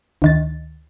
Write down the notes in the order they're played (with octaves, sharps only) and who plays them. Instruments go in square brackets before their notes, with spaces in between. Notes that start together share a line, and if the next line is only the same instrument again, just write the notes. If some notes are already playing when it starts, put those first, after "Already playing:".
[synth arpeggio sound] D2 D#3 A6